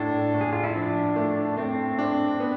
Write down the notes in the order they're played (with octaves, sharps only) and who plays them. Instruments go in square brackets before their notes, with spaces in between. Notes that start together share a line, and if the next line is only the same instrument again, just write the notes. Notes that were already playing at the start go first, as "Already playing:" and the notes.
Already playing: [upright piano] A2 [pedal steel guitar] D4
[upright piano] A2
[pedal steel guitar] G#4
F4
E4
[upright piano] F3 [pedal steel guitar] D4
[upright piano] A3
[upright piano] A3 [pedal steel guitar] C4
[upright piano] D4
B3